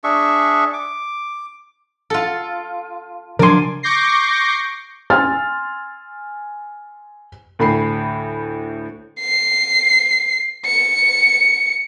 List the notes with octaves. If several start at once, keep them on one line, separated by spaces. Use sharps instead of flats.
D4 G#4 E5 C#6
D6
F4 A4
C#3 F3 F#3 D4 A#4 G#5 C6
C#6 D6 G6 A#6 C7
G#5 C6 E6 F6 A6
D2 A2 B5 C7
C7
C#7